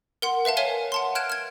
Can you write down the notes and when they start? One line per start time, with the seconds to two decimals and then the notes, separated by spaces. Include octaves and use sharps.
0.22 A#4 F#5 C6
0.45 B4 E5 F5 A5
0.57 A#4 C#5 E5 F5 G#5
0.92 F#5 A5 C6
1.15 F6 F#6 G#6 D7 E7
1.30 F6 G#6